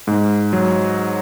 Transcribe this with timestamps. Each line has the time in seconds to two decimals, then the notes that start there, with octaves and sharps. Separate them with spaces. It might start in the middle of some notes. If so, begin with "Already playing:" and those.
0.07 G#2
0.53 F#3